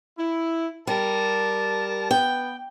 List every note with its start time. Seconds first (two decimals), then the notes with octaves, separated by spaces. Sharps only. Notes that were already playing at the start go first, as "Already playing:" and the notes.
0.18 E4
0.87 G3 A#4 A5
2.11 B3 G5